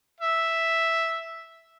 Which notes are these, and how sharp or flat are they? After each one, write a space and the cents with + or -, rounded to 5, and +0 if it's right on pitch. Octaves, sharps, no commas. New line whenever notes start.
E5 +0